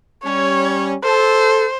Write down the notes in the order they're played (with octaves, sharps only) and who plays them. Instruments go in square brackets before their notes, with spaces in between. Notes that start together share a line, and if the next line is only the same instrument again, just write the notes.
[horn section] G3 C#4 [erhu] C#5
[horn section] A4 [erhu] C5